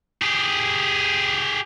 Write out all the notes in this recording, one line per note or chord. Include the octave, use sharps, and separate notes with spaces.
G4 G#4